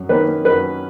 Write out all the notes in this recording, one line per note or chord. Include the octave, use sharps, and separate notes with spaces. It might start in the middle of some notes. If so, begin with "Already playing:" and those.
Already playing: F#2
D#3 A#3 C#4 B4
F#2 B4